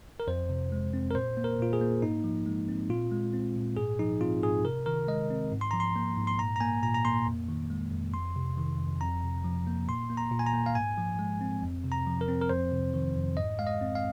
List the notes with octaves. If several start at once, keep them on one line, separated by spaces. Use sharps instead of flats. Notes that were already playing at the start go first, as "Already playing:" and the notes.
A#4
F2 C5
C3
G#3
C4
A#4
A#2 C5
A#3
A#4
A#2 F4
G#4
A#3
G#2 D#4
F3
G#3
C4
A#2 F4
G#3
C4
A#2
G#2 G#4
F3 D#4
C4 F4
G#2 G#4
C3 A#4
D#3 A#4
G#3 D#5
C4
G#2
C6
F3 A#5
C6
A#3
G#2
C6
A#2 A#5
A#5
A#3 G#5
A#2 A#5
A#5
A#3 C6
F2
D#3
G#3
F2
F2 C6
C3
D#3
F2
F2 A#5
C3
F3
A#3
A#2 C6
A#3
A#5
A#2
G#5
A#5
A#3
F5
G#2 G#5
F3
G#3
C4
F2
C3
A#5
F3
A#4
C4
A#4
F2 C5
C3
D#3
F2
G#2 D#5
G#3 F5
D#5
C4
F5